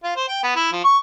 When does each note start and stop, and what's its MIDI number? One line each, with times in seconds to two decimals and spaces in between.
0.04 0.13 65
0.16 0.24 72
0.29 0.42 79
0.43 0.51 59
0.56 0.69 64
0.72 0.84 53
0.84 0.98 85